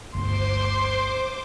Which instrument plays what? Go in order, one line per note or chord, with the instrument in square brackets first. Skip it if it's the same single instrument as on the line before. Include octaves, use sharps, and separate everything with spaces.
[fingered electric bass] G1 D2 [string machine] C5 D6 [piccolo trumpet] C6